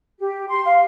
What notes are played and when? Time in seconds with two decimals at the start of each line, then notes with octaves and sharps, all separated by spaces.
0.20 G4
0.49 C6
0.65 F5